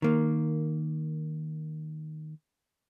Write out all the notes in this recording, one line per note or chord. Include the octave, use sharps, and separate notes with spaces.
D#3 A#3